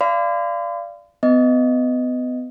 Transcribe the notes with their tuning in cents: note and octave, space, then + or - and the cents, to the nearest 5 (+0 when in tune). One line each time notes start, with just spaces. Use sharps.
D5 +0 F5 -25 C6 -45
B3 +35 D#5 +0